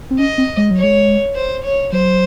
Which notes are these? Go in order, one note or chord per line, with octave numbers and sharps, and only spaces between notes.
C4
C#4 D#5
C4
G#3
F#3
C#5
G#3
C5
C#5
F#3 C5